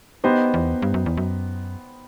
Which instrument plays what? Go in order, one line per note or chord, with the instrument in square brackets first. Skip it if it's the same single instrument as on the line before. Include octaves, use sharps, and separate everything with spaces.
[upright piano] B3 D#4 G4 C5 D#5
[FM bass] E2
G2
F#2
E2
F#2